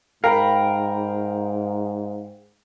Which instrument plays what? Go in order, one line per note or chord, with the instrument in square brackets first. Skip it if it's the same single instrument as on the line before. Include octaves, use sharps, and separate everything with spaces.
[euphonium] G#2 [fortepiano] A#4 [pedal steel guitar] F5 G5 B5